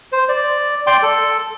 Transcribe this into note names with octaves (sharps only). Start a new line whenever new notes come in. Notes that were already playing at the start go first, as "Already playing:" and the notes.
C5
D5
D5 G5 C6
A4